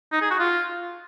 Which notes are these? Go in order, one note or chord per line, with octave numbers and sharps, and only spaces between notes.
D#4
G#4
F#4
F4